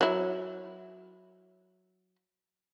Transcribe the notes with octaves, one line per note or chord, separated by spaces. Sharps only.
F#3 E4